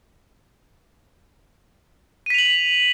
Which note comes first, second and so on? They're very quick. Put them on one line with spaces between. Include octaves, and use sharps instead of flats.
D#7 B6 F7 F#7